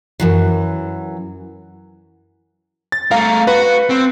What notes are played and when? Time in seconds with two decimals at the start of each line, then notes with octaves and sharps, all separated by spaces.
0.20 F#2 E3 F#3
2.92 A6
3.11 A3 A#4 F5
3.47 F#4 B4
3.89 C4